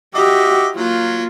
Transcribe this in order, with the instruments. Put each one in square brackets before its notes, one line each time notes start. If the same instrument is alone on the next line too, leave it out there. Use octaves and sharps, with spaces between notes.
[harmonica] D#4 E5 D6 [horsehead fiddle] F#4 G4
[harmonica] F#3 [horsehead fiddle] A#3 F4